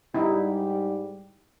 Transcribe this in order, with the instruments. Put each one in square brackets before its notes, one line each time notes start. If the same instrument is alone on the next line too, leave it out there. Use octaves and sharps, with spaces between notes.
[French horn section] G#2 G3 G4 [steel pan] D#4 E4